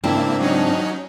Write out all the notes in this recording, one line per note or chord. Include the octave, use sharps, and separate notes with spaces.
G#2 C#3 A#3 C4 D4 E4
F#3 C#4 D#4